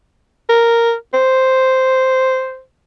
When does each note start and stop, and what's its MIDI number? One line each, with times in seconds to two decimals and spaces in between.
0.49 0.94 70
1.14 2.61 72